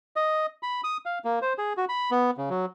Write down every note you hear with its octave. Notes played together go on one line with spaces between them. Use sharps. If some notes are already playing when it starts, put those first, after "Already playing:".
D#5
B5
D#6
F5
A#3
C5
G#4
F#4
B5
B3
C#3
F#3